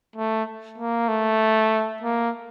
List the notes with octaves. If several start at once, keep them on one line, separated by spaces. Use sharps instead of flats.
A3
A#3
A3
A#3